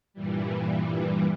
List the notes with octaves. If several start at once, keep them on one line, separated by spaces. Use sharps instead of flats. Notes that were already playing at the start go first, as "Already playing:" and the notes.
G2 A#2 E3 G3